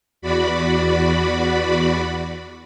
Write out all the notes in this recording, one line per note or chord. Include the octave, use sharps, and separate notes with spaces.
E2 F#4 D5 B5